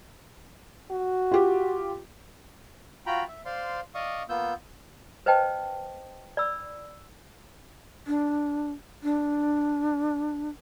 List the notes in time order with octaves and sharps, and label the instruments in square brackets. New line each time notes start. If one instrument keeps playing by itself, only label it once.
[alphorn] F#4
[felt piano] F4 G4
[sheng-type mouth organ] F4 F#4 G5 A#5 B5
E5
C5 D5 F5 C6
D5 D#5 F5 C#6 D#6
A#3 B3 F4 E6 G6
[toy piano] B4 C5 D#5 G5 A5
D5 B5 E6
[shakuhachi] D4
D4